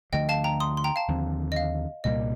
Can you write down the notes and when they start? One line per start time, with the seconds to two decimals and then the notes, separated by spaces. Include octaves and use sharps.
0.12 D2 D3 F3 A3 D#5 G5
0.29 F5 A5
0.44 G5 A#5
0.60 C6 D#6
0.77 C6
0.84 G5 A#5
0.96 F5 A5
1.08 D#2 D3 F3 C4
1.52 D#5
1.56 F5
2.04 C2 A#2 G3 A#3 D#5